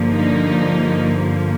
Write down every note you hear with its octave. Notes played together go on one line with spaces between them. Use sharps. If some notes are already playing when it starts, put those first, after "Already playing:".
Already playing: G2 D3 F3 A#3
D#4